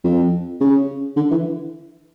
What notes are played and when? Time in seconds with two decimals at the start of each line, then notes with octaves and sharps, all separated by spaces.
0.04 F2
0.60 C#3
1.16 D3
1.31 E3